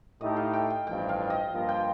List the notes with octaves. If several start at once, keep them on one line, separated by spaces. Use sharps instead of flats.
A2 A3 D#4 G4 D#5
F5
G5
G5
A1 G2 F3 G5
F5
D#5
G2 F3 A#3 F4
G5